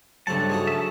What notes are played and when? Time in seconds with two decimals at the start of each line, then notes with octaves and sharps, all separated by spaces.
0.27 G2 C#3 F#3 A3 C4 F#5 A5
0.49 G#3 A3 D#4 F#4 G#4
0.67 E5 A5